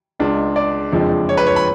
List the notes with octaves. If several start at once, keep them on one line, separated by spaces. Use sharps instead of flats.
C#2 C#3 G#3 D4
D5
F#1 F2 F3 G#3 D4
C#5
B4
C#5
B5